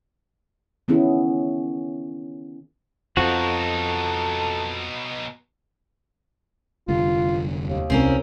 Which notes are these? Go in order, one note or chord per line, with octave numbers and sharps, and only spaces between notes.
D#3 B3 C#4 E4 G#4
F2 B2 F3 D#4 F#4 A4
F1 G2 D3 F4
D#2
C2 C4 C#4 A#4